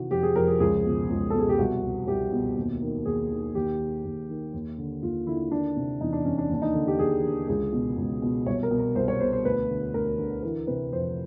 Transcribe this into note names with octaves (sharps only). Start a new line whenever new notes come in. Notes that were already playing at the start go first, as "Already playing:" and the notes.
Already playing: C3 D#3 E3 F#4
F2 G4
G#4
F2 A#4
G#4
C#2 G#4
B2
C#2
B2 A4
G#4
G4
C2 F#4
B2
C2 G4
B2
D#2
D#3
D#2 G#4
D#3
D#2 G4
D#3
D#2
D#3
D#2
D3
D#2 F4
D3 E4
D#3 D4
C3
E2 D#4
D4
E2 C#4
D4
D#2 D4
D#4
D3
G4
D#2 G#4
D3
C#2 G#4
B2
C#2
B2
C2 C#5
A#4
B2
A#4
C2 C5
C#5
B2 C5
C5
D2 B4
D3
D2 A#4
D3
E3 A#4
C3 B4
F2 C5